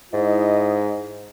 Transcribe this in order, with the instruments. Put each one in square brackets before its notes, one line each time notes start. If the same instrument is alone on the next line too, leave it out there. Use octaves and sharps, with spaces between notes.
[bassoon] G#2 [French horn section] E4 D#5